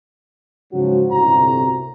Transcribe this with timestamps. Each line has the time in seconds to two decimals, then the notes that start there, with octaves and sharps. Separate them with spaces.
0.73 G#2 C#3 F3 F#3 C#4 F#4
1.11 G1 C2 A2 C3 F#4 A#5